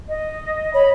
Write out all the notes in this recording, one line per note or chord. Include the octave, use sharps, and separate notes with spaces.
D#5
C#5 B5